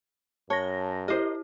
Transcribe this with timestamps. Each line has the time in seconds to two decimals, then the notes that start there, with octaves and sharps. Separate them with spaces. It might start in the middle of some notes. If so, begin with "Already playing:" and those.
0.50 F#2 C#5 A5 A#6
1.08 E4 G4 A#4 C5 D#5